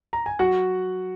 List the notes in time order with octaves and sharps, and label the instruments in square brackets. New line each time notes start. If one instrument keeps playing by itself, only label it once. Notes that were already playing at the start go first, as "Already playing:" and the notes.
[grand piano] A#5
G#5
[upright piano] F#3 [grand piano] F#4 F#5